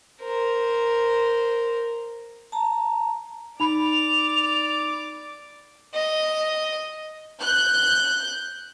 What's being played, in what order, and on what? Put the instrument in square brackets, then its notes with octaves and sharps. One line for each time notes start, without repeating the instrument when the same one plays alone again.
[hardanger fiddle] A#4 C5
[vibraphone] A5 A#5
[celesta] D#4 B5 [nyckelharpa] D5 D6 [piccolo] F7
[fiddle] D#5
[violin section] F#6 G6